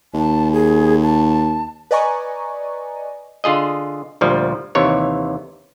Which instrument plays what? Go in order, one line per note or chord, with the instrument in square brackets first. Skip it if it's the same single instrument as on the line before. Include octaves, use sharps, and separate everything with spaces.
[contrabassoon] D#2 [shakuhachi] A5
[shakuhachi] G#4
A5
[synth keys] B4 D5 D#5 G#5 A#5 C#6
[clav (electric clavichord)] D3 F4 G#4 D#5
D2 A#2 F3 G3
D#2 C3 E3 C#5